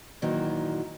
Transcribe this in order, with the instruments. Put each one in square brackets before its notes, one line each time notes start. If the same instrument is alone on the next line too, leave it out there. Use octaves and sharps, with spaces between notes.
[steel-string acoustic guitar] F#2 A#2 D#3 E3 F#3